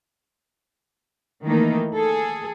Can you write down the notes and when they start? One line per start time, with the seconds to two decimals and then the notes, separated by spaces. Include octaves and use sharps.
1.44 D#3 E3 A3 A#3 D#4
1.94 G#4 A4